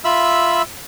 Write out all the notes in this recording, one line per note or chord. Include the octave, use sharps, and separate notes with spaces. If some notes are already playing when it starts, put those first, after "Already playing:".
F4 E5 B5 E6